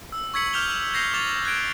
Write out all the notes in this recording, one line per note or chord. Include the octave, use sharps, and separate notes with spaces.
E6
C#6 E6 G#6 B6 C#7 F#7
D6 F6 G6 F7 G7
G6 G#6 A#6 C7 F7
C#6 D6 A6 F7 G7
F#6 G#6 D7